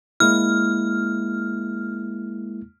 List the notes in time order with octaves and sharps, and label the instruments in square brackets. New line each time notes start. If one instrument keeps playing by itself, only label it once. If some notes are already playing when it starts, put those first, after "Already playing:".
[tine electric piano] G#3 A#3 E4 [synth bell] F6